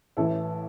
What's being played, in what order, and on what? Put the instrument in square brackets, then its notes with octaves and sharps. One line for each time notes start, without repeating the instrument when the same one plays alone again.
[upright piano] A1 A2 E3 E4 A4